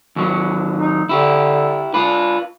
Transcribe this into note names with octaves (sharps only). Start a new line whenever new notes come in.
D#2 F#3
D#4
D3 E4 G4
D4 F4 B4